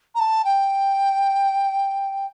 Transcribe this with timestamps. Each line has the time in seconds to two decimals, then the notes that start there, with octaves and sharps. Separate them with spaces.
0.15 A#5
0.20 A5
0.44 G5